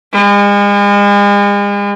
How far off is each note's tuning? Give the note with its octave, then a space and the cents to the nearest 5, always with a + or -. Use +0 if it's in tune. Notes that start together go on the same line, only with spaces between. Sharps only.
G#3 -40